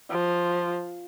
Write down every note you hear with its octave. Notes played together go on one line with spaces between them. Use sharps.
F3